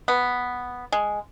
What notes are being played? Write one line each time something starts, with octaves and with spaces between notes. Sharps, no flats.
B3
G#3